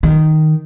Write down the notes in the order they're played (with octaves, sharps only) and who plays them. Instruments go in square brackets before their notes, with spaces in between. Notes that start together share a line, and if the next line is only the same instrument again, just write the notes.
[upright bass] D#3